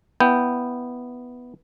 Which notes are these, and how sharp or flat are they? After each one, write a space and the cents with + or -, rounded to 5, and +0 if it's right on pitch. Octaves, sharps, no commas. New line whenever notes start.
B3 +0 E4 +0 G5 +0